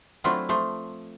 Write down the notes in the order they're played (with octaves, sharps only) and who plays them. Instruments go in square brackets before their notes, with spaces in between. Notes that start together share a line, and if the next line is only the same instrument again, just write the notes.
[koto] F#3 A3 C4 D4 E4 F4
F3 A3 C5